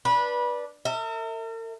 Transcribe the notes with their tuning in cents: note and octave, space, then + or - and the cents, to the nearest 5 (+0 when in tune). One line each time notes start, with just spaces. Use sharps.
D4 +0 B4 -20
A#4 -45 E5 -20